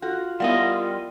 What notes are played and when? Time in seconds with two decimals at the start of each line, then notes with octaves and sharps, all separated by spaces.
0.02 F4 F#4 A4
0.40 G3 B3 E4 A#4 D#5 F5 F#5